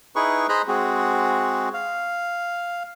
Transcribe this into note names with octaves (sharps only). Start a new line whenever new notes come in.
D#4 E4 G#4 B4 C#6
G#4 C5 D#5 A#5 B5 F#6
G#3 C4 F#4 G#4
F5